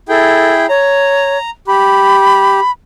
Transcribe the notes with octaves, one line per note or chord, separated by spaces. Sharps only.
E4 G#4 A4 G5
C#5 A#5
G4 B5